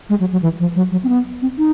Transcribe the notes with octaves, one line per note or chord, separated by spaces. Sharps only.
G#3
F#3
F#3
E3
F3
F#3
F#3
C4
B3
C4
D#4